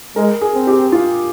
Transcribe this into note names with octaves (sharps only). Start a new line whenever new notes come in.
G#3 A#4
G#4
C4
G4
F4